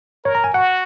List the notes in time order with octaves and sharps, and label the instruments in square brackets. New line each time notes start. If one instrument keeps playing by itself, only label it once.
[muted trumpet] A#4 [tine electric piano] C#5
[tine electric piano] A#5
G#5
[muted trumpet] F#4 [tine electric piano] F#5